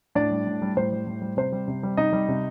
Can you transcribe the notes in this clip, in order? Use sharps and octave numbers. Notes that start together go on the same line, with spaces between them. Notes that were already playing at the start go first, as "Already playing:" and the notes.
A2 D4 D5
G3
A2
G3
A2 C5
G3
A2
G3
C3 C5
G3
C3
G3
C3 D#4 D#5
G3
C3